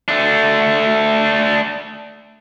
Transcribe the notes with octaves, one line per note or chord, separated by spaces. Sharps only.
A3 D4